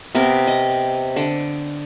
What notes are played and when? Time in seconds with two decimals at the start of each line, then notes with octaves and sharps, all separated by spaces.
0.15 C3 B3 C4 A#4
0.47 D#5
1.16 D3